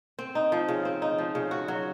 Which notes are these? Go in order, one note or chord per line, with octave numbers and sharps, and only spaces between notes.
C4
D#4
F3
C#3
C4
D#4
F3
C#3
F#4
F#3